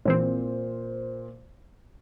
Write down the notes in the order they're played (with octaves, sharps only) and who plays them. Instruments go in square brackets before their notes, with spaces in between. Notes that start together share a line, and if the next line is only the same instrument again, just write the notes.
[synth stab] A#1 E3 C4 [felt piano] A#2 C5